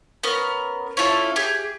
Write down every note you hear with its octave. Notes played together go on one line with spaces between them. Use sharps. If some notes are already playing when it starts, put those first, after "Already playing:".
B3 C#4 A#4
C#4 E4 F4 A4
G4 G#4